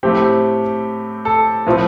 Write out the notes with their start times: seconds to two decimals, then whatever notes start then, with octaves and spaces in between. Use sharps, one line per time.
0.03 A2 A3 C4 G4
1.25 A4
1.67 A2 F3 A3 C4